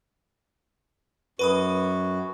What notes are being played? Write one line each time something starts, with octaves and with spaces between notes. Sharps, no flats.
F#2 F#4 B4 B5 D#6